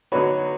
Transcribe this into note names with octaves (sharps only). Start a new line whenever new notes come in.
D3 F#3 B3 D#4 F#4 B4 C#5